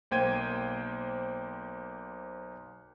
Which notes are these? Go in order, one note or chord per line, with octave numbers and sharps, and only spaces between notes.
B1 A#3 C5 G5 G#6 D#7